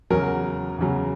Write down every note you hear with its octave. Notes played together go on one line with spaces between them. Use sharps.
E2 C#3 F#3 A#4
E2 C#3 F#3